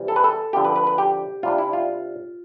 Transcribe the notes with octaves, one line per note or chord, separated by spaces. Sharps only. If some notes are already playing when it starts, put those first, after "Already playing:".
Already playing: C3 E3 G3
A4
B4
A4
D3 F3 C4 E4 G4
B4
B4
B4
G4
C3 G3 D4 F4
E4
F4